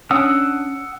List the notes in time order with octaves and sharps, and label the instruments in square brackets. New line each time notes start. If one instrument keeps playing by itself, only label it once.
[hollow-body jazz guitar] C#4 D4 [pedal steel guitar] F#5 D#6 E6